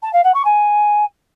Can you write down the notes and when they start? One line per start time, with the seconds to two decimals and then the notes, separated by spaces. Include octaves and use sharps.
0.03 A5
0.13 F5
0.24 F#5
0.34 C#6
0.45 G#5